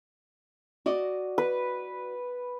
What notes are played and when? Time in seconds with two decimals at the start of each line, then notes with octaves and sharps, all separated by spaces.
0.86 F#4 D5 D#5
1.38 B4